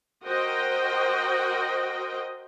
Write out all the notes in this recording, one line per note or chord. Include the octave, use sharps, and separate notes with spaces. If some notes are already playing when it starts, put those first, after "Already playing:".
F#4 A#4 C5 D#5 G5